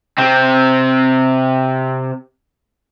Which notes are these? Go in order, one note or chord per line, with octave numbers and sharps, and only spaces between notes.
C3 C4